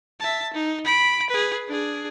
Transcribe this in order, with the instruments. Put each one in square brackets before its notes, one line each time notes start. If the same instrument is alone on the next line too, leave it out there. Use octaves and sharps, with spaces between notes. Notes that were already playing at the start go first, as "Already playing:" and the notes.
[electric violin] E5 A5
D#4
B5 D7
G#4 B4
D4 G#4